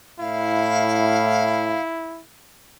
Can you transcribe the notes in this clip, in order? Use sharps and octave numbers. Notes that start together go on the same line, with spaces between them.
A2 E4 F5